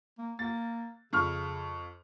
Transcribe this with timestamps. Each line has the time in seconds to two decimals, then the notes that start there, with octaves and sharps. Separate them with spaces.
0.18 A#3
0.39 A#3 A6
1.13 F2 C#3 C#6 F6